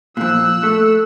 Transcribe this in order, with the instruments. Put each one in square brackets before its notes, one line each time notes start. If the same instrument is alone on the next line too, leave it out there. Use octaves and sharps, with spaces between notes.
[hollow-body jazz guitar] A#2 F3 [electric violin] E6 F#6
[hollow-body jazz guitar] A3